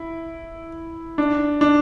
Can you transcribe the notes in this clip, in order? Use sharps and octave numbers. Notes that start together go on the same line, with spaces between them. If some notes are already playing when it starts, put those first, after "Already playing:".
Already playing: E4
D4
D4